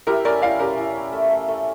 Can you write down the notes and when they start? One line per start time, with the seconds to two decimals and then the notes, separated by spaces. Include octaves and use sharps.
0.07 E4 G4 A#4
0.25 C#4 A#4 D5
0.42 E4 D5 F5
0.59 C#4 G4 A#4
0.78 E4
0.96 C#4
1.13 A3
1.30 A3
1.48 A3